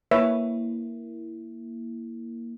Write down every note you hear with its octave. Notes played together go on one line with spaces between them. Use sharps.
A#3 E4 B4 C#5 E5